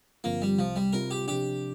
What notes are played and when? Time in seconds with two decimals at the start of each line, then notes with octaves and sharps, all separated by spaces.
0.24 G2 D3 F3 A#3 C4 F4
0.42 G3
0.58 C2 C3 F3 G3
0.76 G3
0.93 C3 G3 C4 F4 A#4
1.11 G4
1.28 C3 F3 D4 G4